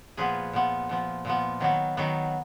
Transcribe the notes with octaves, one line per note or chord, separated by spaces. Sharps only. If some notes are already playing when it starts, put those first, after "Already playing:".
A#2 F3 B3 G#4 B4
A#2 F3 B3
A#2 F3 B3
A#2 F3 B3
D#3 F#3 B3
D#3 F#3 B3